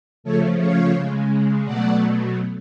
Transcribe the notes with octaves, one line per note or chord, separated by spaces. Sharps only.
C#3 F3 A3 A4 C#5
C#5 F5
C#3 G#3
B2 F#3 A3 D5 F#5